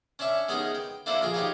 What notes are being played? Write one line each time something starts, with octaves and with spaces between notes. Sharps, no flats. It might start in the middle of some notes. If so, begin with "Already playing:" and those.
C#4 D4 C#5 E5 C#6
G#3 B3 C#4 D#4 G#4 A#4
G5
A#3 D4 E4 A4 B4 C5
A#1 F4 G#4 A#4
D#4 G4 A#4 B4 C#5 F5